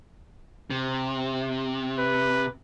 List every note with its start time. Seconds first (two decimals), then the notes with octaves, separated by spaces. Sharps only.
0.70 C3
1.99 B4